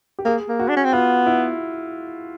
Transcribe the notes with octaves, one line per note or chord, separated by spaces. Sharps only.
G4
A#3 G#4
A#3
F#4
D4
C#4
C4
B3 F4
E4